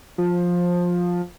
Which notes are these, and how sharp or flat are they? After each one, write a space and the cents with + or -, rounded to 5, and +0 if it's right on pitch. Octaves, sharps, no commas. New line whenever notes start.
F3 +15